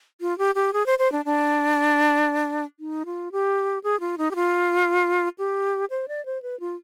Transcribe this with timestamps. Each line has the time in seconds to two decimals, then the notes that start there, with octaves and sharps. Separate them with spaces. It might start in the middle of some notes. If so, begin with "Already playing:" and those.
0.21 F4
0.38 G4
0.55 G4
0.73 G#4
0.86 C5
0.99 C5
1.12 D4
1.25 D4
2.80 D#4
3.05 F4
3.32 G4
3.84 G#4
4.00 F4
4.18 D#4
4.31 G4
4.35 F4
5.38 G4
5.90 C5
6.08 D5
6.25 C5
6.42 B4
6.60 F4